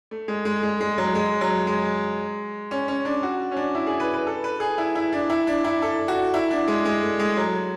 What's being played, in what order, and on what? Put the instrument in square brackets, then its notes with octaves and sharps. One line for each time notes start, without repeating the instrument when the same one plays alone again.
[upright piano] A3
G#3
G#3
G#3
G#3
F#3
G#3
F#3
G#3
C#4
C#4
D4
F#4
C#4
D4
E4
G#4
B4
B4
A4
B4
G#4
E4
E4
D4
E4
D4
E4
A4
F#4
E4
D4
G#3
G#3
A3
G#3
F#3